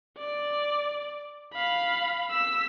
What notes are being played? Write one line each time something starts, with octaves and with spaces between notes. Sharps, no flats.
D5
F5 B5
E6 B6